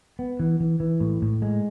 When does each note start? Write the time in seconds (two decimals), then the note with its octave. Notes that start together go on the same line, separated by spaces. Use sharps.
0.19 B3
0.40 E3
0.60 E3
0.80 E3
1.00 A2
1.22 A2
1.42 G#3